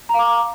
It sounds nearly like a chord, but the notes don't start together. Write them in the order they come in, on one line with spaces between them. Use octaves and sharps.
A#5 F5 D6